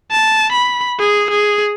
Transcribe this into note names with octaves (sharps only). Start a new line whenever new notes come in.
A5
B5
G#4
G#4